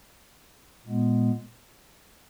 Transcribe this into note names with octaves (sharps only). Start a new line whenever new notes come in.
A#2 G#3 B3